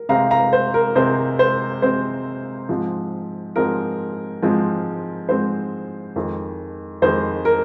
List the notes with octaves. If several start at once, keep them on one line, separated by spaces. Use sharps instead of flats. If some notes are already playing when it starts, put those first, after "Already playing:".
Already playing: A#4
C3 G#3 C4 F5 A#5
F5 A#5
C5
A#4
C3 G#3 C4 C5
C5
C3 G#3 C4 C5
G#2 F3 G#3 C4
G#2 F3 G#3 C4 A#4
G#2 F3 G#3 C4
G#2 F3 G#3 C4 C5
F2 D#3 G#3
F2 D#3 G#3 C5
A#4